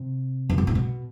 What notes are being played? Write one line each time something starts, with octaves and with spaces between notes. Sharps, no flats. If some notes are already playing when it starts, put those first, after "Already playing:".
Already playing: C3
F2
G2
A2
B2